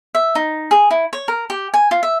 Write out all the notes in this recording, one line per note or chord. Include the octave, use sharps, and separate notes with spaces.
E5
D#4
G#4
E4
C#5
A#4
G4
G#5
F4
E5